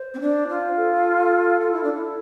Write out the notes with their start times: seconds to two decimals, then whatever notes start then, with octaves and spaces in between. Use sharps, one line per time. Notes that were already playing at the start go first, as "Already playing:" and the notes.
Already playing: C5
0.14 C4
0.20 D4
0.49 F4
0.77 A4
1.61 F4
1.72 E4
1.84 D4
1.94 E4